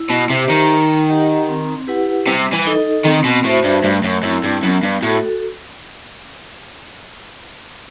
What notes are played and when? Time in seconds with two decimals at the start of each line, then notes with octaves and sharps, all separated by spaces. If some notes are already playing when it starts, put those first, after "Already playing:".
Already playing: E4
0.10 B2
0.30 C3 G4 C5 E5
0.49 D#3
0.69 D#4
1.09 G4 D#5 F#5
1.48 C4
1.87 E4 G4 B4 F#5
2.26 C3 G3
2.53 E3
2.66 D#4 A4 D#5
3.05 D#3 C4
3.25 B2
3.44 A2 F#4 C5 E5
3.64 G2
3.84 G2 A3
4.04 F#2
4.23 F#2 C4 E4
4.44 G2
4.63 F#2 B3
4.83 G2
5.02 A2 F#4 A4